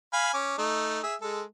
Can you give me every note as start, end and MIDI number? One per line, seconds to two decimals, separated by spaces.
0.13 0.33 77
0.13 0.33 80
0.13 0.33 83
0.34 0.58 61
0.34 0.58 86
0.59 0.99 57
0.59 0.99 63
1.03 1.15 68
1.03 1.15 76
1.22 1.43 56
1.22 1.43 69